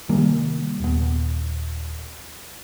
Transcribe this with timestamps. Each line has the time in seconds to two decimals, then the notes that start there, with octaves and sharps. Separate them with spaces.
0.09 C3 D#3 G3 A#3
0.80 D#1 B3